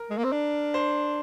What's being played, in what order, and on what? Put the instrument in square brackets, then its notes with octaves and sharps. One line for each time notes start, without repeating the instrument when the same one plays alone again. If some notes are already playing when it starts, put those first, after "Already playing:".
Already playing: [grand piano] A#4
[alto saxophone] G#3
A#3
C4
D4
[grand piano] C5